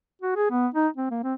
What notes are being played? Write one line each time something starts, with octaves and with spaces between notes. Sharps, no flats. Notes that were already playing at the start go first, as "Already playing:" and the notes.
F#4
G#4
B3
D#4
C4
A#3
C4